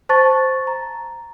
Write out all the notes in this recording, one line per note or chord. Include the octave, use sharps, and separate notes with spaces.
C5 A5 C#6 A6
A#5